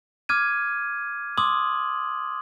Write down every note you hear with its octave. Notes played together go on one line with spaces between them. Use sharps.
D6 F6 G#6 D#7
C6 D6 D#6 F#7